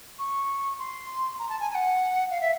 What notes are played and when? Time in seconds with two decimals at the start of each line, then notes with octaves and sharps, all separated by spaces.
0.19 C#6
0.79 C6
1.39 A#5
1.49 A5
1.60 G#5
1.70 G#5
1.75 F#5
2.30 F5
2.41 E5